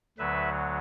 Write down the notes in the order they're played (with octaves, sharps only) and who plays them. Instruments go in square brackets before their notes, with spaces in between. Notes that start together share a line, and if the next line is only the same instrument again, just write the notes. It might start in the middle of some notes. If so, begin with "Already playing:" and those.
[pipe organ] D2 D3 F#3 B4 E5